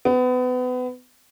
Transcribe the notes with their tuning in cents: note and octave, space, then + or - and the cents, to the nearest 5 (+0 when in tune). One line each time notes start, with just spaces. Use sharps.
B3 +30